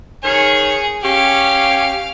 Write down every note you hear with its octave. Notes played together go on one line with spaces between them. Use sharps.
D#3 G#4 C#5
C#4 G4 F5